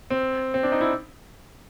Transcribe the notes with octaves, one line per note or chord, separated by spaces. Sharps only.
C4
C4
D4
D#4
E4